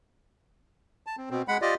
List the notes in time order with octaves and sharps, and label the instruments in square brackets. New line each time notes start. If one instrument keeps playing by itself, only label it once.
[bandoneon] A5
C4
B2 C4
G#3 F#5 B5
F4 G4 D5 D#5